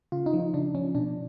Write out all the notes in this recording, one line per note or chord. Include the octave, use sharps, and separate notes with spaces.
C#3 F4
D#4
F3
D#4
C#3 D4
F3 C#4
B2 D4